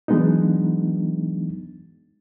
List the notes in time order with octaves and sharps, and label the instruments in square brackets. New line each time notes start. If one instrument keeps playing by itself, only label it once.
[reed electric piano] E3 F#3 G#3 B3 D4 D#4